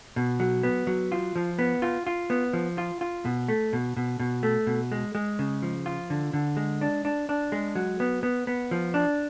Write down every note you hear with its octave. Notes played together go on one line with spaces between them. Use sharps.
B2
F#3
B3
F#3
F4
F3
B3
F4
F4
B3
F3
F4
F4
B2
A3
B2
B2
B2
A3
B2
G#3
G#3
C#3
F3
F4
D3
D3
G#3
D4
D4
D4
G#3
F#3
B3
B3
B3
F3
D4